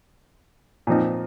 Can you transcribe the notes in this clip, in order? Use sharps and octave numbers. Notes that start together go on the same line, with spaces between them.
A#2 F3 C4 D#4